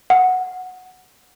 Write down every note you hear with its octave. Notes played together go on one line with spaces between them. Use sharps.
F#5